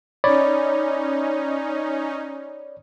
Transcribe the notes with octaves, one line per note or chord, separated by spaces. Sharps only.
C#4 D#4 C#5 D5 B5